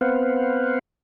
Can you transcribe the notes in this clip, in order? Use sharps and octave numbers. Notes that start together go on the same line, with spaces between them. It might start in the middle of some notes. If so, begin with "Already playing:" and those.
B3 C4 B4 C5 F5 F#5